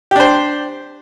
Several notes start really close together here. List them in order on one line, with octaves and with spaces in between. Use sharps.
G4 D4 C5